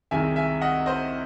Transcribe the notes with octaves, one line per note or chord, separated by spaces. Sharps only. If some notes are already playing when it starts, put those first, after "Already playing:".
C2 C3 D#3 G#3 E5 G#5
E5 G#5
D#5 F#5
C5 D#5